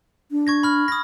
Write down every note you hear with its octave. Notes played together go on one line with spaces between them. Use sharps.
D4
C#6 G#6 A#6
B5 F6
D#6 A#6